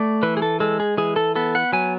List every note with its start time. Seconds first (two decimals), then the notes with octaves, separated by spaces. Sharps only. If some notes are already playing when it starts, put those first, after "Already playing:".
Already playing: A3 D5
0.23 E3 B4
0.37 G#4
0.42 A4
0.60 G#3 A4
0.80 G#4
0.97 E3 G#4
1.16 A4
1.36 B3 A4
1.55 F#5
1.73 F#3 G#5